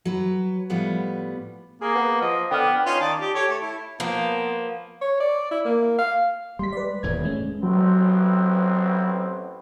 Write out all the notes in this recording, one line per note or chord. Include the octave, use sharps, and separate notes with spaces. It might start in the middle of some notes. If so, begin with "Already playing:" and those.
F#3 B4
A2 F3 G3 B3 B4 F#5
A#3 G#4
B3
F3 D#5
D3 B3 G5 D6 F6
C#4 D#4 F4
D#3 D5 A5
G4
G4 A4 C#5
A3
E4
F3 A#3 B3
C#5
D5
E4
A#3
F5
G3 G#3 C6 B6
B4 D5
D#1 E2 A2 G#6
G#3 A3 C#4
A1 F#3 B3 C4